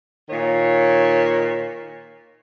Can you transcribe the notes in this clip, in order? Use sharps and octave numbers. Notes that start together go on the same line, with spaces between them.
A#2 D#3 C#5